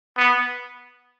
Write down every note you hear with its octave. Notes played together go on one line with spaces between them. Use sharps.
B3